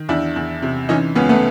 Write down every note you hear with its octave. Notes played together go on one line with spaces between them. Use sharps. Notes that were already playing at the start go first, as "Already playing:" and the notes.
Already playing: D#3
E2 D4 E4
E2
C3
E3 C#4 D#4
C#2 B3 C#4
A3 B3